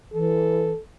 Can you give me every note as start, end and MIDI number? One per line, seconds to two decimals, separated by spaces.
0.13 0.71 52
0.13 0.79 69